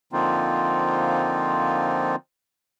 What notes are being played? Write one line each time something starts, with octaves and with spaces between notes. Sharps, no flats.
D3 F3 A#3 C4 D#4 F4